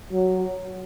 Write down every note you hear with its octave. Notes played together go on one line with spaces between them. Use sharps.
F#3